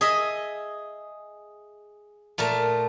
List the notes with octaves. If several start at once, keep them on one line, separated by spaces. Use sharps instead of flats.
G#4 D#5 E5
A#2 A3 A#4 A5